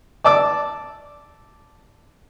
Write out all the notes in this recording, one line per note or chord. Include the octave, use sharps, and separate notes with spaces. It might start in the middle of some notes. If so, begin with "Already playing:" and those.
D5 A5 D6 E6